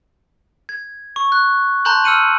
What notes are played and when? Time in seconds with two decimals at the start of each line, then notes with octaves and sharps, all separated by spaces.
0.69 G#6
1.16 C#6
1.32 F#6
1.85 A5 A#5 C6 F#6 G6 F#7
2.04 E6 F6 C#7 D#7 F#7